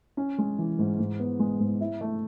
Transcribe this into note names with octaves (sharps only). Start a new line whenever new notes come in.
C#4
G#3
E3
G#2
G#2
B3
G#3
G#2
E4
A3